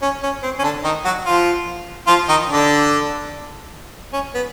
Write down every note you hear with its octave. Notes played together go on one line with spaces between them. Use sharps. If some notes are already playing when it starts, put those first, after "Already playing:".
C#4
C#4
C4
C#4
D3 D4
D#3 D#4
F#3 F#4
F3 F4
F3 F4
D#3 D#4
D3 D4
C#4
B3